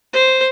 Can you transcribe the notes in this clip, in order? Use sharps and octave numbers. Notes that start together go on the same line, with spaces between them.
C5